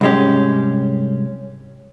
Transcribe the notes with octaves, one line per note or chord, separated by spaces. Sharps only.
C2 G#2 G#3 C#4 G4